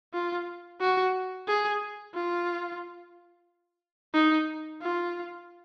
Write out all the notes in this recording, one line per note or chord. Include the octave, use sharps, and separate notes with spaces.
F4
F#4
G#4
F4
D#4
F4